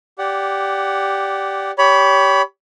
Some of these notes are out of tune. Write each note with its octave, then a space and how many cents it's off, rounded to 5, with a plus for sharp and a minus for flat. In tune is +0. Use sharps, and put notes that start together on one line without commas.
G4 +0 D5 -15 F#5 +10
G4 +0 C#5 +30 B5 +0